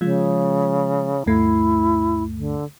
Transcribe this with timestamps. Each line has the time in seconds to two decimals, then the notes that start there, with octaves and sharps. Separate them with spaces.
0.01 C#3 F3 G#3 F4
1.26 D2 G2 A3 E4
2.37 D3